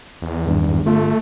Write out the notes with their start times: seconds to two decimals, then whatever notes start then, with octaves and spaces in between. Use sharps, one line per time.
0.22 E2
0.46 G#1 G2
0.86 G1 A3 F4